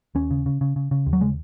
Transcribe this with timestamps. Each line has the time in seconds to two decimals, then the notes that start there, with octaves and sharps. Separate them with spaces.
0.15 D#2 C#4
0.31 C#3
0.46 C#3
0.61 C#3
0.76 C#3
0.91 C#3
1.07 D#2
1.13 F#3
1.21 C#3 G#3